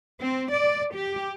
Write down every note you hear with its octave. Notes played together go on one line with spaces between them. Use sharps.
C4
D5
G4